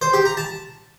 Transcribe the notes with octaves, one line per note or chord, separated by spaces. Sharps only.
C5
G4
A#5
A5